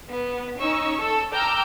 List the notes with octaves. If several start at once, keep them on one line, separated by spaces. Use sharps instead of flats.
B3
C#4 D#4 C#6 E6
A4 E6
G5 A#5 D6 E6 F6 G6